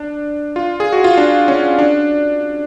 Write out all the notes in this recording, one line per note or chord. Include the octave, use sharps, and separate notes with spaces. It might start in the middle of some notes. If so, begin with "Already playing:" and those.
Already playing: D4
F4
G#4
F#4
F4
D4
C#4
D4